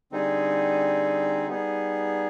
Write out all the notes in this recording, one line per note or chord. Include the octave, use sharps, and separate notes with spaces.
D3 G3 C4 D#4 G#4
G3 B3 D#4 G#4